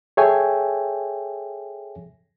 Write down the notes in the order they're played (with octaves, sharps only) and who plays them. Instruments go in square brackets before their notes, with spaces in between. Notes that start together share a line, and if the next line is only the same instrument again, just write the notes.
[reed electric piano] G#4 A4 C#5 E5 G5 G#5